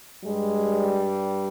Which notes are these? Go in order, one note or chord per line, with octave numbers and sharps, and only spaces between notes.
G2 G3 G#3